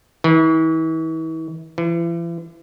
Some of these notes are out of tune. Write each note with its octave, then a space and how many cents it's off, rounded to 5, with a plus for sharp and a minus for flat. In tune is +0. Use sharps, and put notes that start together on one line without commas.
E3 -40
E3 +40